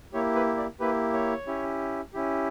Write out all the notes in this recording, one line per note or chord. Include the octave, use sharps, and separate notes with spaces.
A#3 E4 G4 C#5
B4
D5
A#3 E4 G4 B4
C#5
C#4 E4 G4
C#4 E4 G4